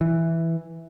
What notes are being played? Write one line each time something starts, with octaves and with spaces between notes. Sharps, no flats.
E3